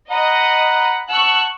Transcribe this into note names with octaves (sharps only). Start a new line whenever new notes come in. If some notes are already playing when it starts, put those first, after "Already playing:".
D#5 F#5 A#5 B5
F#5 A5 C#6 E6 F#6